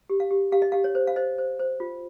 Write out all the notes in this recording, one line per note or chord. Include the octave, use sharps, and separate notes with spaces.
G4
F5
G4
G4 F5
D#5
G4 F5
C#5
C5
F5
C5 D#5
C5
C5
F4